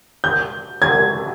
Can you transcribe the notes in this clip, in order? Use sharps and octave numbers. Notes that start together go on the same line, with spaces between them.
G6
G#6